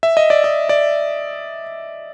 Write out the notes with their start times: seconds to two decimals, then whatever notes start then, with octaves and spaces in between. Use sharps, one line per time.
0.03 E5
0.17 D#5
0.30 D5
0.44 D#5
0.69 D5